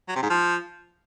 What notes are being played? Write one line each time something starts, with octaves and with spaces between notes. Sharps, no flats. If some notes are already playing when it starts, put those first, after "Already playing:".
F#3
C3
G#2
F3